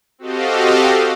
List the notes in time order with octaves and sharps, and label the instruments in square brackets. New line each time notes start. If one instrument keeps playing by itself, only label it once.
[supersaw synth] C4 F#4 G4 A4 D#5 F5